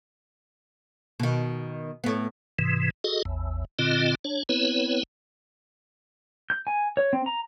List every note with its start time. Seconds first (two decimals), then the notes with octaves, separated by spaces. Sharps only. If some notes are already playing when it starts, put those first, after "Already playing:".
1.20 B2 D#3
2.04 A2 B3
2.59 G#2 C3 E3
3.04 F#4 G#4 A4 D#5
3.25 A1 E2
3.79 A#2 D3 C4 F4 D#5
4.24 D4 C#5
4.49 B3 C4 E4 B4 C#5
6.50 G6
6.67 G#5
6.97 C#5
7.13 C4
7.26 A#5